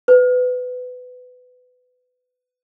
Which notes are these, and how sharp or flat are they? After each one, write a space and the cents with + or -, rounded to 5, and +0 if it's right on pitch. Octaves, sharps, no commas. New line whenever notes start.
B4 +20